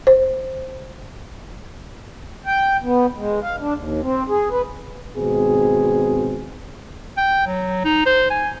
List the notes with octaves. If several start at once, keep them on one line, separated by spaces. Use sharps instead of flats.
C5
G5
B3
G#3
F5
D4
D#2
C4
G#4
B4
G#1 B2 C4 G#4
G5
F#3
D#4
C5
G#5